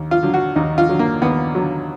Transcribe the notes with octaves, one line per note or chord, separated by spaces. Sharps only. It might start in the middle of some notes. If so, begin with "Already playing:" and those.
Already playing: D#2
F4
D3 F#3
F#4
D#2 D#4
F4
D3 F#3
A#3
D#2 B3
D3 F#3